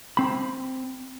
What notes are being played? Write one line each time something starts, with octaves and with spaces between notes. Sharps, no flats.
C4 B5